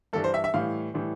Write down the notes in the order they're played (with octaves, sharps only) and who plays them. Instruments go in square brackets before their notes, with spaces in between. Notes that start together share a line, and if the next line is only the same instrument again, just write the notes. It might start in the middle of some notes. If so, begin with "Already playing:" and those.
[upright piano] G2 E3 G3 A4
C5
E5
E5
A2 E3 G3 F5
A2 E3 G3